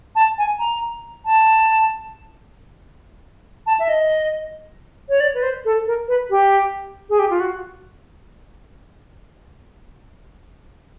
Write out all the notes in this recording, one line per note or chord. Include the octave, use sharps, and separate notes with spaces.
A5
G#5
A#5
A5
A5
E5
D#5
C#5
D5
B4
C5
A4
A#4
B4
G4
G#4
G4
F4
F#4